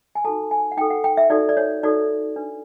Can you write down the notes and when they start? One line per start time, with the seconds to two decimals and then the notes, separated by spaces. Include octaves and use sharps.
0.15 G#5
0.25 D#4 F#4 A4 A5
0.51 G#5
0.72 F#5
0.77 D#4 F#4 A4 G5
0.90 F#5
1.04 G5
1.17 E5
1.30 D#4 F#4 A4 D5
1.49 D5
1.57 C#5
1.83 D#4 F#4 A4 D5
2.36 D4 F#4 B4